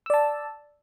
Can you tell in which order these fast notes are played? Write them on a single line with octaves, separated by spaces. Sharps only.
E6 D5 A5